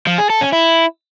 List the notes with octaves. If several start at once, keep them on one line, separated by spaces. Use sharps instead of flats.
F3
G#4
A4
C#4
E4